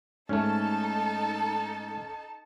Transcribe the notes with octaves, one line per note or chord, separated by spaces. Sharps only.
G#2 A3 C#4 D#4 A4 A5